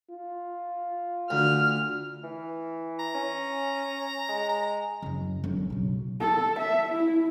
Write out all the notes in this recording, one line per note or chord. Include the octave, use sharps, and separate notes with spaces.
F4
D2 F6
E3
A#5
C#4
G#3
A#5
F#1 F#2
G1 F#2
B1 C#3
A4
E5
E4